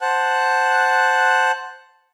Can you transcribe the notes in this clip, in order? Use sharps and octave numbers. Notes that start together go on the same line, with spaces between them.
C5 F#5 A5 F#6